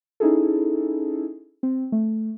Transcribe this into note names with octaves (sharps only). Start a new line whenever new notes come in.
C#4 D#4 E4 G#4 A4
C4
A3